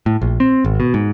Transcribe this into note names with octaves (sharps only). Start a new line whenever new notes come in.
A2
A#1
C4
G#1
B2
G#2